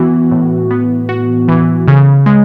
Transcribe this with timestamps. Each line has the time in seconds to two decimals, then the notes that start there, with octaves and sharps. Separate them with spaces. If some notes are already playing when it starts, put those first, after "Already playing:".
Already playing: E3 B3 F#4
0.31 A2
0.71 B3
1.09 F#4
1.48 E3
1.88 C#3
2.26 G#3